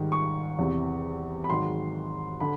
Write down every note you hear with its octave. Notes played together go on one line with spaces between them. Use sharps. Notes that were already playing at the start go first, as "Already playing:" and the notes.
Already playing: G#2 D#3 G3
C#6
E2 C3 E3
B5
G#2 D#3 F#3 C6
D3 B5